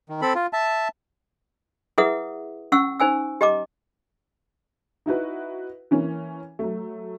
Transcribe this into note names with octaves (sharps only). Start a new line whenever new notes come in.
D#3
C4 A4 B5
F4
E5 A5
E4 G#4 B4 E5 F#5 D#6
C#4 F#5 C#6 E6
D#4 C5 G#5 E6
G4 D#5 A#5 D6
D#4 E4 F#4 B4
E3 A#3 C#4
F#3 A3